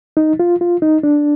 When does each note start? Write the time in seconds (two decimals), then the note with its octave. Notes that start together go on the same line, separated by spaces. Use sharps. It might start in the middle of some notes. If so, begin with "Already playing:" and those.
0.17 D#4
0.40 F4
0.61 F4
0.82 D#4
1.03 D4